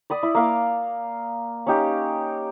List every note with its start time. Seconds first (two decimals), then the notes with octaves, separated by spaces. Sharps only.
0.10 D5 B5 D#6
0.23 E4
0.35 A#3 F5 D6
1.67 C#4 D#4 G4